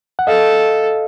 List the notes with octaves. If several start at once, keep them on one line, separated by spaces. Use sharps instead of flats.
F#5
A4 D#5 F5